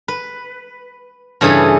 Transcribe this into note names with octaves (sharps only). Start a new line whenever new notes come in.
B4
G2 C#3 E3 G#4 A4 B5